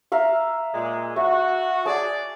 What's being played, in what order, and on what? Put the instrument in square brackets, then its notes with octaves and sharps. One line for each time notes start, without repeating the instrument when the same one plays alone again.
[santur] E5 F5 A#5
[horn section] A#2 G#3
[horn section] F#4 [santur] E5
[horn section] G#4 D5 [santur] A5